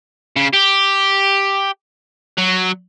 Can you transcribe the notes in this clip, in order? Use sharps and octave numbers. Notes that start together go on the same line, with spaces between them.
C#3
G4
F#3